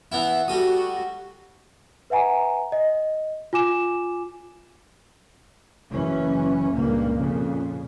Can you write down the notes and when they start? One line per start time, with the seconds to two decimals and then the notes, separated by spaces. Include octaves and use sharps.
0.12 E3 B3 E4
0.48 G3 F#4 A4 D#6
2.10 B4 E5 F#5 G#5 A#5
2.72 D#5
3.53 F4 G#5 D6 E7
5.91 F#1 E3 C#4
6.73 C#2 G2 A#2 A#3
7.17 F2 A#2 C#3